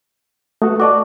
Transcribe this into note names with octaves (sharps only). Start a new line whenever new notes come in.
A3 F#4 A4 B4 E5 D#6
F#4 D5 D#5 A5 C#6 D6